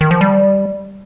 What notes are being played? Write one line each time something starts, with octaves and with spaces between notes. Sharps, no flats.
D#3
F3
G3